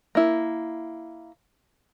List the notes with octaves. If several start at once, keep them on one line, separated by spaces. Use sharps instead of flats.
A#3 E4